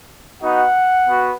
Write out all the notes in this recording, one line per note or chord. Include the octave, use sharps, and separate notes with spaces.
B3 D#4 F#4 F#5
B3 F#4